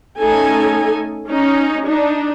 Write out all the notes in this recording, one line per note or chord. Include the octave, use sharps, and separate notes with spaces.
A3 C#4 D#4 A4 G#5
C#4 D#4
D4 D#4